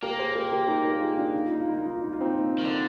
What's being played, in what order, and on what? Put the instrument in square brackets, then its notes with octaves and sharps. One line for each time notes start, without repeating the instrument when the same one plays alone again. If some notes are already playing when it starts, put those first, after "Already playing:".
[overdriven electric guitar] A#3 [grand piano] G4 A#4
[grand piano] G#4 C5
G4 A#4
G4 A#4
D#4 G4
G4 A#4
F4 G#4
D4 F4
D#4
F4
D#4
F4
D#4
F4
D#4
F4
D#4
F4
C4 D#4
[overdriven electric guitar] D#3
D3